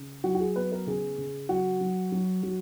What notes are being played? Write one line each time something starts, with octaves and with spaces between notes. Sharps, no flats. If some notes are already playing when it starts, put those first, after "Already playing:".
Already playing: C#3
F#3 F#4
F#4
G#4
B3 B4
A#4
C#3 G#4
C#3
F#3 F#4
F#3
F#3
F#3